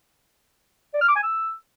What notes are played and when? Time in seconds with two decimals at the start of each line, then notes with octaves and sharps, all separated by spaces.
0.94 D5
1.01 F6
1.08 D6
1.16 G#5
1.23 E6